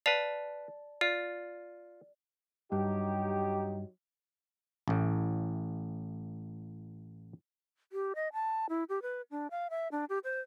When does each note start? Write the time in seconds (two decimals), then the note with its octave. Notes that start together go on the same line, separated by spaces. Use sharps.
0.06 B4 D5 F5 A5
1.01 F4 D5
2.72 G2 F#3 D#4 G4
4.88 A1 A2
7.92 G4
8.15 D#5
8.33 A5
8.69 E4
8.89 G4
9.02 B4
9.31 D4
9.51 F5
9.70 E5
9.92 D4
10.09 G4
10.24 C5